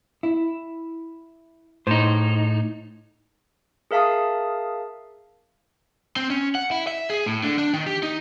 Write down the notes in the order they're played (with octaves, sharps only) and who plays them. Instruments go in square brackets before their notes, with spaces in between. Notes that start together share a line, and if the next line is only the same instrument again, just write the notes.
[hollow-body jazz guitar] E4
[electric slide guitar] A2 D#4 [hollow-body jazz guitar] C5
[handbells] G#4 A#4 E5 F5 A5 D#6
[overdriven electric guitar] C4
C#4
F#5
E4
E5
G#4
A2
D3
D4
D#3
G4
D#4